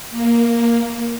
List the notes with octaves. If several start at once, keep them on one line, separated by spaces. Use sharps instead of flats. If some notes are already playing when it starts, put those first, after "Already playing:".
A#3